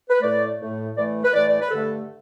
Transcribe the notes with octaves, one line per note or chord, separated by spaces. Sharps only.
B4
A2 A3 D5
A2 A3
A2 E3 A3 D5
B4
A2 E3 A3 D5
D5
B4
G2 D3 A3 A4